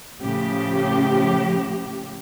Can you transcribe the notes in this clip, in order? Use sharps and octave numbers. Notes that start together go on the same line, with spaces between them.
A2 C#3 F3 G4